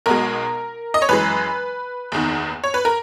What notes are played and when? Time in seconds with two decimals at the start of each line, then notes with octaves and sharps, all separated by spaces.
0.06 B1 B2 G#3 A#4
0.94 D#5
1.02 C#5
1.09 F#2 E3 G#3 B4
2.12 F#1 E2 D#3
2.64 C#5
2.74 B4
2.85 A#4